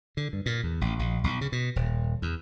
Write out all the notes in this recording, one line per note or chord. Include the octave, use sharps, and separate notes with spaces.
D3
G2
A#2
E2
A1
A#1
B1
C#3
B2
D#1
E2